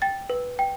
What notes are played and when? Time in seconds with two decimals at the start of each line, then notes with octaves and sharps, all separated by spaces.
0.02 G5 A6
0.30 B4
0.59 G5